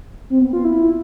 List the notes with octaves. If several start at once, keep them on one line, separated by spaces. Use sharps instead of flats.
C4
B3
F4
E4